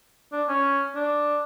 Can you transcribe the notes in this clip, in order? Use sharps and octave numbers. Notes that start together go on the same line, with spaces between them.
D4
C#4
D4